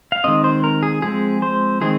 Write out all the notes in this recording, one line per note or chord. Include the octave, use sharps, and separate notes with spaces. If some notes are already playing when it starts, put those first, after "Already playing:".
F5
D#3 G#3 C4 D#5
C5
A#4
G#4
F3 G#3 C4 G#4
C5
D#3 G#3 C4 G#4